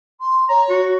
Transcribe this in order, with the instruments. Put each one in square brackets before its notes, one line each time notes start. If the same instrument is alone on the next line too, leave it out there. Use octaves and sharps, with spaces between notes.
[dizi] C6
[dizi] C#5 [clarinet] A#5
[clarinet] F#4